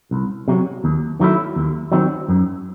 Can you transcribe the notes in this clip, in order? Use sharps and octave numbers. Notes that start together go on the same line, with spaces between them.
C2
C3 F#3
D#2
D#3 F#3 A3 E4
D#2
D#3 F#3 C4
F#2